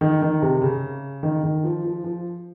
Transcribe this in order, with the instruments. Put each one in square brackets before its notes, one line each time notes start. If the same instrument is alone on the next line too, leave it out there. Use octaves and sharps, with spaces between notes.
[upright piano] D#3
D#3
C3
C#3
D#3
D#3
F3
F3
F3